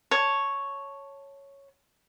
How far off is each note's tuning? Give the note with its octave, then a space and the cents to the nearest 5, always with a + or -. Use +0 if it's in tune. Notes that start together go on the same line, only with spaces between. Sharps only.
C#5 +0 A5 +0